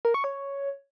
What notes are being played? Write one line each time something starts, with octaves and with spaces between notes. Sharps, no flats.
A#4
C#6
C#5